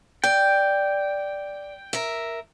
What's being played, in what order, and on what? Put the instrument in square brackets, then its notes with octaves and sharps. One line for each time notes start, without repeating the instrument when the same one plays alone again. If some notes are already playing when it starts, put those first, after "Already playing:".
[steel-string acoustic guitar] D5 [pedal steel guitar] G5
[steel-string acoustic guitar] A#4 E5